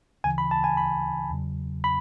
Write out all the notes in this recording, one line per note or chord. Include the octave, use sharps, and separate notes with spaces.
D2 C#3 E3 G#5
B5
A5
G#5
B5
E2 C#3 F#3
B5